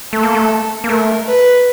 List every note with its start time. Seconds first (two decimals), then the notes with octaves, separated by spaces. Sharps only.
0.13 A3 A4
0.23 A#3
0.35 A3
0.84 A#3
0.88 A3 A#4
1.27 B4